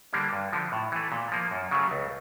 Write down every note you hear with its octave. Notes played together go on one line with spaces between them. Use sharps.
D3 G3 A#3 D4
G2
D3 F3
A2
E3 A3
A#2
F3 A#3
F#2
C#3 F#3 A3
C#2